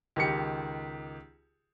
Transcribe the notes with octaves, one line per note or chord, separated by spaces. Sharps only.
C#2 D#3 G4 C#7